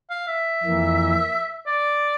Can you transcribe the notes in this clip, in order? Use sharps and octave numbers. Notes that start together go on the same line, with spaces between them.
F5
E5
F2 E3 A#3
D5